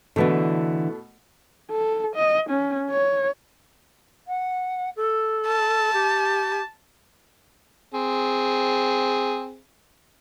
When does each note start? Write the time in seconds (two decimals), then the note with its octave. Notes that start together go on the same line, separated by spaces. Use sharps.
0.16 B2 D3 E3 A3 D4
1.71 A4
2.16 D#5
2.50 C#4
2.90 C#5
4.27 F#5
4.96 A4
5.47 A5
5.93 G4
7.94 C4 G#4